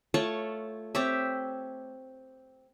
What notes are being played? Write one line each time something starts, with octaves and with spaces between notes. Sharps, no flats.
A3 F4 C#5 A5
C4 G4 C#5 E5